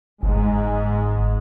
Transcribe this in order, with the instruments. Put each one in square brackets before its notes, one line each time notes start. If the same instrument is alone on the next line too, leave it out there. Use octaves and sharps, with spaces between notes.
[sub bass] G1 [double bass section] G#2 G#3